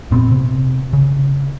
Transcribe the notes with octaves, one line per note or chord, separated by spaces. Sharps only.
F1 A#2 B3 C4
C3
C#3